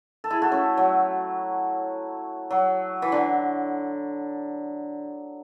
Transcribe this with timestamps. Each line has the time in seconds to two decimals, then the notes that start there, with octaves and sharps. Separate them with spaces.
0.24 A4
0.30 E4 G#4
0.42 F#4 A4
0.52 A3 C#4
0.77 F#3
2.51 F#3
3.02 E3
3.12 D3